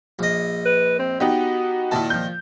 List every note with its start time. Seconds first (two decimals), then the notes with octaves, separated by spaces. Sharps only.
0.19 A#1 D#5
0.66 B4
0.99 C4
1.20 B3 D#4 F#4 G4
1.91 A#2 D#3 E4 A5
2.10 F3 G6